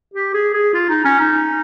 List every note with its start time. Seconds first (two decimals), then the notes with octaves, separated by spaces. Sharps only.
0.14 G4
0.34 G#4
0.54 G#4
0.74 F4
0.89 D#4
1.05 C#4
1.20 D#4